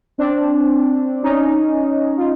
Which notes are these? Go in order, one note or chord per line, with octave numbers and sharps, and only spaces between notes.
C4 D4
C#4 D#4
F4